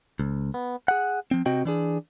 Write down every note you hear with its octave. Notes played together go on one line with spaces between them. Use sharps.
C#2
B3
G#4 F#5
F3 C4
C3 C4 F#4 D#5 G5
E3 D4 G#4